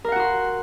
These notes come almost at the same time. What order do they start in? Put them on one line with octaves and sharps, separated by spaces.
A#4 F5 F#5 F#4 C6